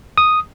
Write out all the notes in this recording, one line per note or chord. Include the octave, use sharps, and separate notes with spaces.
D#6